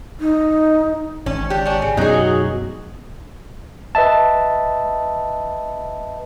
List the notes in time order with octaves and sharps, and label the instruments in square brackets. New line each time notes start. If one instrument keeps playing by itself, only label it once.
[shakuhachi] D#4
[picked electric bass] G#1 [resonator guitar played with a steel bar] C#4
[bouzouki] D4 [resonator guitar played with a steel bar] G4
[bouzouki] C#4 D4
C#3
[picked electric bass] F#2 B2 [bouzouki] F#3 F#4 [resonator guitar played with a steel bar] D#4 G#4
[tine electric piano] B4 D#5 E5 A5